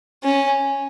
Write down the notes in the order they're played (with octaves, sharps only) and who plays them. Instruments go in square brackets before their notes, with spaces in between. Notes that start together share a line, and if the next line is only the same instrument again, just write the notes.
[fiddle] C#4